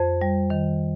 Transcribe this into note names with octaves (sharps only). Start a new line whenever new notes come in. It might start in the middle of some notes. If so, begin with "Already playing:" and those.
Already playing: F2 C5
G3
D#3